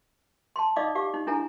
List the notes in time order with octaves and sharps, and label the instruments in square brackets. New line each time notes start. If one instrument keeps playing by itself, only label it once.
[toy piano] A5 C6
D#4 D5 D#5 F5 D6 D#6
G4 F5 D6
D#4
D4 E4 A4 G#5 A#5